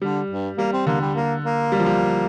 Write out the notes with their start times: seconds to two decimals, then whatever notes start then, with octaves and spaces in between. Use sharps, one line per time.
0.01 D3 G3
0.30 G2
0.58 G3 A#3
0.73 C4
0.87 D3 A#3
1.01 G3
1.15 A#3
1.44 A#3
1.72 G3
1.79 F3
1.86 G3